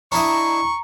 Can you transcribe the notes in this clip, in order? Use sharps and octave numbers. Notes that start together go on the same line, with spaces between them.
D4 E4 D#5 A#5 C#6